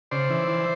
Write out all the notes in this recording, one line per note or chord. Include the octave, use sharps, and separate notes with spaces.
C#3 C5 D5
E3
E3